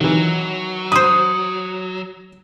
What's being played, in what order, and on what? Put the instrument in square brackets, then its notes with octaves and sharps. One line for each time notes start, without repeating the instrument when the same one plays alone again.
[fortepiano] D#3 E3 [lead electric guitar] F#3
[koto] B4 C5 [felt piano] D#6